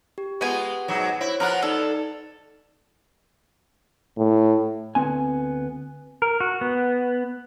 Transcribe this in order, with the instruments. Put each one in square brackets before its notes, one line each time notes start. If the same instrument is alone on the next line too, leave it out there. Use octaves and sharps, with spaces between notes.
[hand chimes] G4
[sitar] G#3 F4 [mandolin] B3 G#5
[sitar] G#2 B2 F#3
[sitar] E4 [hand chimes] C5 C#5
[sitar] F3 F4 B4 [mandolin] A#4 F#5
[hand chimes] D#4 D5 [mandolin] A4
[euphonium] A2
[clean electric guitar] D2 B3 C4 G#5
[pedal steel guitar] A#4
F#4
B3